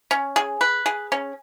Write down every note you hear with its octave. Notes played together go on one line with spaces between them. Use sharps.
C#4
G#4
B4
G#4
C#4